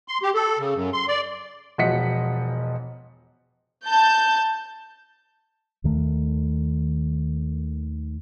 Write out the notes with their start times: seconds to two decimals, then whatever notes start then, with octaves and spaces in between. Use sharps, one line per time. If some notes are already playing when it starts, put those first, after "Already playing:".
0.08 C6
0.22 G4
0.35 A4
0.59 C#3
0.75 F#2
0.93 C6
1.08 D5
1.78 E1 F3 D#5 F#5 B6 C#7
3.86 A5 G6
5.84 D#2 D#3 A3